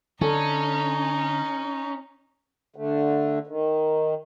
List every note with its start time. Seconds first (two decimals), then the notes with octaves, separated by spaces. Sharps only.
0.21 D3 C#4 D#4 A4
2.76 D3 A3
3.47 D#3